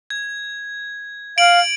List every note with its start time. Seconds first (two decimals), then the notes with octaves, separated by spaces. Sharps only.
0.10 G#6
1.38 F5 D7 F#7